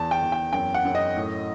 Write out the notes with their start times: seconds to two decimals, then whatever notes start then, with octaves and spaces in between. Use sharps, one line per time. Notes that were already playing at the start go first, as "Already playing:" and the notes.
Already playing: E2 A5
0.11 G5
0.22 E2
0.32 G5
0.53 F#2 G5
0.74 F#5
0.84 F#2
0.95 D#5
1.16 A2